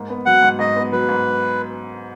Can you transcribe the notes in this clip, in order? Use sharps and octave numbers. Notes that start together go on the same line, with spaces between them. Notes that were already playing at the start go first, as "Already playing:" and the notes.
Already playing: G#2 A#3
B3
F#3 F#5
G#2
G#2 D#5
B3
F#3 B4
G#2